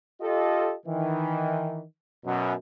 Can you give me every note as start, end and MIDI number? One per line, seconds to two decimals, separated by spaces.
0.21 0.74 65
0.21 0.74 67
0.21 0.74 69
0.21 0.74 75
0.86 1.82 51
0.86 1.82 52
2.25 2.53 42
2.25 2.53 47